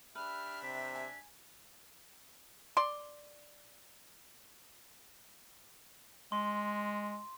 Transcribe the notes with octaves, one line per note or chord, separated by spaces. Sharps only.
D4 G4 B4 E5 F6
C3 B6
G#5
D5 C6
G#3 C6